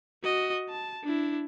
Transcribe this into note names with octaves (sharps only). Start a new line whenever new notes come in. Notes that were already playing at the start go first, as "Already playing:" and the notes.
F#4 D#5
A5
D4 E4